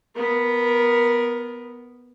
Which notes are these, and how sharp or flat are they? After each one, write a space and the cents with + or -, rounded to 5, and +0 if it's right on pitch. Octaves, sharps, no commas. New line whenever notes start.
B3 +0 A#4 +15